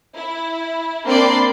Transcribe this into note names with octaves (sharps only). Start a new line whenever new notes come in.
E4
A#3 C4 D4 D5 B5 C6